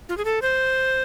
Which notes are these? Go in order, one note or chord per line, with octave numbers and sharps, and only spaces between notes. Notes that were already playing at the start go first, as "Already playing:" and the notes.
F4
G#4
A4
C5